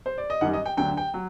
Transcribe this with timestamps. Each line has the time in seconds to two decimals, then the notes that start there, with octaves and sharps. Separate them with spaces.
0.06 C5
0.18 D5
0.30 D#5
0.41 F#2 D#3 G3 F#5
0.53 D#5
0.66 G5
0.77 D2 D3 F#3 G5
0.97 G5
1.14 F#3